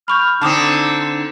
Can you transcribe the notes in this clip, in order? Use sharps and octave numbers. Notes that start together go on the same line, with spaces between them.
B5 C#6 F6 G6
D3 C4 D#4 A5 D6 D#6